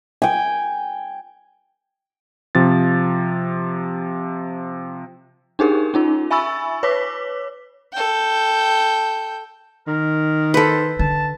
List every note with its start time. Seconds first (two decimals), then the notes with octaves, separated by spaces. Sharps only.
0.22 G5 G#5
2.55 C3 F3 A6
5.59 D4 D#4 G4 G#4 A#4
5.94 C#4 D#4 F4
6.31 E5 G#5 B5 C#6 E6 A6
6.83 B4 C#5 D6 B6
7.93 A4 G5
9.87 D#3 A#4
10.54 A4 B4 C5
10.99 D3 A5